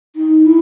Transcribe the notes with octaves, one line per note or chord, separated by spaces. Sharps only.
D#4
E4